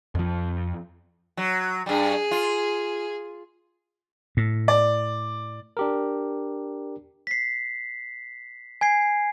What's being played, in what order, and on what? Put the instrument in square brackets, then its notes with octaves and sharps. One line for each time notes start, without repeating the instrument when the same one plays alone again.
[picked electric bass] F2 F3
[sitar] F#3
[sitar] G2 G3 [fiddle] G#4
[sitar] F4
[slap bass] A2
[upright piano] D5
[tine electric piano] D4 G4 A#4
[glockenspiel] B6 C7
G#5 G#6 C7